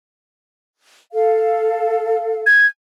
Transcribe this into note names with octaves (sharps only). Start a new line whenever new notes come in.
A4 F5
G#6